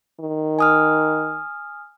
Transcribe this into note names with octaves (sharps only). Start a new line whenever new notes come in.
D#3
G#5 D#6 F6